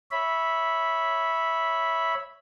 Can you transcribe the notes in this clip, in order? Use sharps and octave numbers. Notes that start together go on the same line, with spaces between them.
C#5 E5 B5